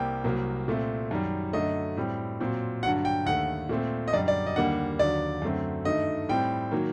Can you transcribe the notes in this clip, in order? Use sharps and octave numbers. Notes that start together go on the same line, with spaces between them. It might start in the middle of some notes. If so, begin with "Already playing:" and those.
Already playing: C2 C3 G3 A#3 G5
C2 C3 F#3 A#3
A#2 A3 C4
F#2 D#3 G3
F#2 D3 A3 D#5
A2 G3 C4
A#2 F#3 C4
G2 D3 F#3 F#5
G5
D#2 D3 A3 F#5
A#2 A3 C4
D#5
F#2 D3 G3 D5
D5
D#5
D#2 D3 G3 A#3 F#5
D#2 D3 F#3 D5
F#2 D3 A3 C4
G2 D#3 A3 D#5
A2 G3 C4 G5
D#3 F#3 A#3